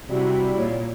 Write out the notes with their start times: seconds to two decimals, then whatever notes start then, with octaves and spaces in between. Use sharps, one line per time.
0.11 C3 G3 E4 F#4
0.58 A#2 C#5